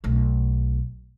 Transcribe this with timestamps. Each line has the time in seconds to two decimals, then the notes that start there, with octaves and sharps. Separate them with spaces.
0.04 B1 A3